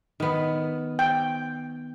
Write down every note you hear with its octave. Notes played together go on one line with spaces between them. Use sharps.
D#3 B3
G5